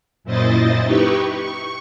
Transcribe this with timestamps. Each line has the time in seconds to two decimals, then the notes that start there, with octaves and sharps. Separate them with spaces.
0.24 F#2 A#2 E4 C5 D#5 A6
0.83 D#4 E4 G4 B4 C#6
1.35 C#6